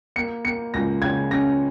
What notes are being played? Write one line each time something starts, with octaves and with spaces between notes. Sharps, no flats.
A#3 C#7
A#3 C#7
C#2 A#6
C#3 G#6
C#4 A#6